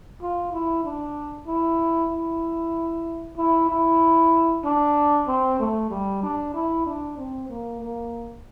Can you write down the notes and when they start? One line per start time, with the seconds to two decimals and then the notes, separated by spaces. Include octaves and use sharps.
0.21 F4
0.52 E4
0.84 D4
1.47 E4
2.11 E4
3.37 E4
3.69 E4
4.65 D4
5.27 C4
5.60 A3
5.90 G3
6.23 D4
6.54 E4
6.86 D4
7.17 C4
7.49 A#3
7.80 A#3